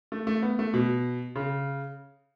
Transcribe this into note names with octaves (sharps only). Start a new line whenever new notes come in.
A3
A3
B3
A3
B2
C#3